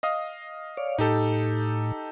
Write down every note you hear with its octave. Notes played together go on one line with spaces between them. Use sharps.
D#5 F5 D#6
C#5 D5 F5
A2 D#4 G4 A4